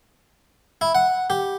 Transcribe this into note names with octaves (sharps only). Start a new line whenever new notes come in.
E4
F#5
G4